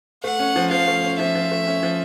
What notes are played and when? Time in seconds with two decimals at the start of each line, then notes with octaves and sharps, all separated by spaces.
0.24 A3 F#5
0.39 C#4
0.56 F3
0.71 F3 F5
0.88 A3
1.03 C#4
1.19 F3 E5
1.35 F3
1.51 A3
1.67 C#4
1.83 F3